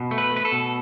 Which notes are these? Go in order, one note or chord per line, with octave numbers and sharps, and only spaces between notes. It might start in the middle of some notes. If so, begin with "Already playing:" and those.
Already playing: B2
A3
B4
A3
B4
A4
B2